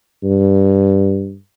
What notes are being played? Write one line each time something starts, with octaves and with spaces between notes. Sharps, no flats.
G2